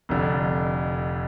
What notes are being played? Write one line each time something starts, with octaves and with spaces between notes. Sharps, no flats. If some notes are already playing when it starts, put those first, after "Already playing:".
F1 F2 D3